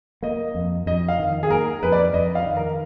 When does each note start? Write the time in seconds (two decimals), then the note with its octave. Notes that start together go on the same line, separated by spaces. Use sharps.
0.23 A#3 D#5
0.55 F2
0.86 F2 D#5
1.08 F5
1.19 D#3
1.43 G#4
1.50 A#3 A#4
1.82 F2 B4
1.92 D5
2.14 F2 D#5
2.35 F5
2.46 D#3
2.57 A#4